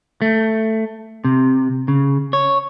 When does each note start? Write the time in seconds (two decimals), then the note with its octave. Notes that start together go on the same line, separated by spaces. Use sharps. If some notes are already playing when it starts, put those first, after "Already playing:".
0.22 A3
1.25 C3
1.88 C#3
2.33 C#5